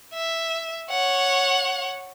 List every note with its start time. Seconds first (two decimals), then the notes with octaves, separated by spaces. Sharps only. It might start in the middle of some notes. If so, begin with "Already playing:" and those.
0.14 E5
0.90 C#5 F#5